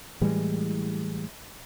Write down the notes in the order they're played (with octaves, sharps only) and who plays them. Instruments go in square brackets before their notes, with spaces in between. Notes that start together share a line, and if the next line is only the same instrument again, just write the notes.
[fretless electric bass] A2 E3 G3 G#3